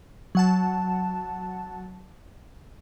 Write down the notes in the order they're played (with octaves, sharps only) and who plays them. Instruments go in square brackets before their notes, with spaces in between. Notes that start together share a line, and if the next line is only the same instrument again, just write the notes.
[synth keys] F#3 F#5 A5